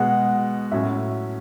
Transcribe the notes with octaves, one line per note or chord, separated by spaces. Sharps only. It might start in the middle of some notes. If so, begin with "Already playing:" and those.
Already playing: B2 G#3 B3 F#5
A2 F#3 C#4 E5